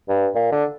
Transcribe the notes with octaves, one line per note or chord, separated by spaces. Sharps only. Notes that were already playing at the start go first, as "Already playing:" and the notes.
G2
A#2
D3